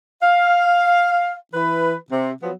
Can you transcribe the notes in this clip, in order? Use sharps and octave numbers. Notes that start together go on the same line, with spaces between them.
F5
E3 B4
C3
F3 F#3 B3